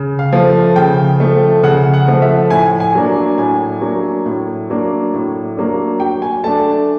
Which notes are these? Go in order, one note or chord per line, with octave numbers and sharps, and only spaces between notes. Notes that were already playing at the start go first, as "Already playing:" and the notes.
Already playing: C#3
F5
F3 A3
C#3 G5
F3 A3
C#3 F#5
F#5
F3 A3
E5
A2 G#5
G#5
F#3 A#3 D4
A2 G#5
F#3 A#3 D4
A2
F#3 A#3 D4
A2
F#3 A#3 D4
F#3 G5
G#5
A3 D4 A5